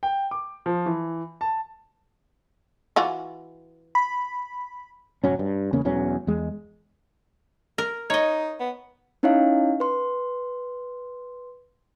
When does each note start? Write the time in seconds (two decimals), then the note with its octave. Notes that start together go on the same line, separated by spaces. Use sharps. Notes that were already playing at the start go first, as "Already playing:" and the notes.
0.03 G5
0.31 D6
0.66 F3
0.86 E3
1.41 A5
2.96 E3 F4 F#4
3.95 B5
5.24 D1 F#2 F#3 C#4
5.39 G2
5.72 E2 C#3 A#3 C#4
5.85 E1 E2 F#3 C#4
6.27 E2 G#3
7.78 A#4
8.10 D#4 C#5 D#5
8.60 B3
9.23 C#4 D#4 E4 C#5 D#5 F5
9.80 B4 C6